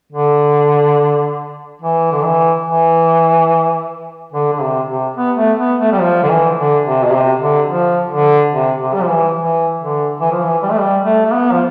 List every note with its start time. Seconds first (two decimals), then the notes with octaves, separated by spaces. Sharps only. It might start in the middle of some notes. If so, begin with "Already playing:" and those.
0.13 D3
1.82 E3
2.12 D3
2.23 E3
2.66 E3
4.33 D3
4.52 D3
4.61 C3
4.88 C3
5.17 B3
5.37 A3
5.59 B3
5.81 A3
5.92 G3
6.00 F3
6.23 D3
6.29 E3
6.57 D3
6.85 C3
7.05 B2
7.13 C3
7.41 D3
7.68 F3
8.11 D3
8.52 C3
8.81 C3
8.94 G3
9.01 F3
9.08 E3
9.37 E3
9.79 D3
10.21 E3
10.32 F3
10.43 E3
10.63 G3
10.70 A3
10.79 G3
11.05 A3
11.25 A3
11.33 B3
11.52 F3